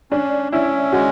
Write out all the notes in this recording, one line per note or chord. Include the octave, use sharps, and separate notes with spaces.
C#4 D4
C#4 E4
G#3 F#4